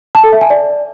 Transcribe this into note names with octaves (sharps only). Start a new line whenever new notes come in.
A5
A4
E5
G#5
D5